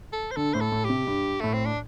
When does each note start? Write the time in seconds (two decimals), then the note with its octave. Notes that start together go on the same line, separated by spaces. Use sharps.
0.13 A4
0.31 C5
0.36 D3 A4
0.54 A2 C5
0.60 A4
0.72 A2
0.84 G4
0.89 C3
1.07 G2
1.40 A2 A3
1.53 C4
1.66 D4